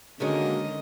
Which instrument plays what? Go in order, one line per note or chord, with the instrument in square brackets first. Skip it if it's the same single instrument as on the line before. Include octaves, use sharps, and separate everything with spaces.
[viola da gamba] D3 D#5 [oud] D#3 G#3 C#4 [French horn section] A#3 F#4